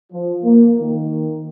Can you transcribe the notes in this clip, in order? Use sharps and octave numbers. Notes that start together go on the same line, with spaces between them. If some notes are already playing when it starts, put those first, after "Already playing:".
F3
A#3
D#3